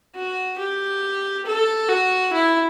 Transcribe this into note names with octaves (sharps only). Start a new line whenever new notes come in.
F#4
G4
A4
F#4
E4